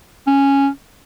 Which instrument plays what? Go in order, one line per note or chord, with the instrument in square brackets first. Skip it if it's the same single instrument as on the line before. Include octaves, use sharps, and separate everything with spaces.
[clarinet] C#4